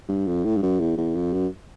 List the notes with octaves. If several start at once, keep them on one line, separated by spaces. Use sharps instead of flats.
G2
F2
A2
G2
F#2
E2
E2
F2
F#2